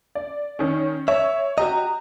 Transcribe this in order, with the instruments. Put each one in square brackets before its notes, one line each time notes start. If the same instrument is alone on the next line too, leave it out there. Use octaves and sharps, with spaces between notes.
[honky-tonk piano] D5
D#3 C#4
[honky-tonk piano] C#5 [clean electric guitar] E5
[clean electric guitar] F#4 G4 D#5 [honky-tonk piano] A#5